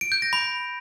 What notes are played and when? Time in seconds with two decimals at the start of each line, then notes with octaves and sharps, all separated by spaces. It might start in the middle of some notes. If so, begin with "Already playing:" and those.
0.01 D7
0.12 G6
0.22 A#6
0.33 B5